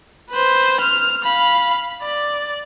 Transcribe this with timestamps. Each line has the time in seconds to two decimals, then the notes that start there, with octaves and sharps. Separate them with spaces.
0.30 B4 C5
0.81 F6
1.24 F5 B5
2.02 D5